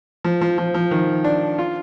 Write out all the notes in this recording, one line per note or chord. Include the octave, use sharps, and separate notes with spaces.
F3
F3
F3
F3
D#3
D4
F4